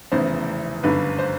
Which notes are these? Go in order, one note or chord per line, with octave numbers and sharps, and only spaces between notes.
F1 E2 C#3 E3 C5
G1 F#2 D3 B4
C5